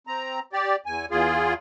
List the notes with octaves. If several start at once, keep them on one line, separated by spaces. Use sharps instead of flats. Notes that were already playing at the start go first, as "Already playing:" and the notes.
C4 A#5
G4 D5
E2 G#5
E2 F4 G#4